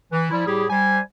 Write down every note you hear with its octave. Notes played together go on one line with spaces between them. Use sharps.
E3
F3 G3 E4
A2 G3 E4 G4 G#4
G3 C5 G#5